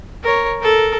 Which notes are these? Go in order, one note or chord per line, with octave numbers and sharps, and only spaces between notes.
A#4 C#5
A4 A#4